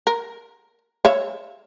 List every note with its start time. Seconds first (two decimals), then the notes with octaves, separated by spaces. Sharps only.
0.07 A#4
1.05 C#5 E5 F5